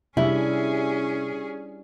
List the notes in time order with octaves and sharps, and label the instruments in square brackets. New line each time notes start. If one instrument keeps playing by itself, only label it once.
[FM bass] C3 [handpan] G3 D4 E5 [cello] C#4 G#4 [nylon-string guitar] E4